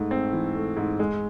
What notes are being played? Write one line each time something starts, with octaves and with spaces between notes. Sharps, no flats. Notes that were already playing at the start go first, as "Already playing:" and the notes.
Already playing: G#2 A3
C4
E3
A3
G#2
G#3